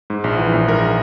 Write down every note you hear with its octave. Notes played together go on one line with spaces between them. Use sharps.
G#2
A#1
E3
A#1
G#2 A#4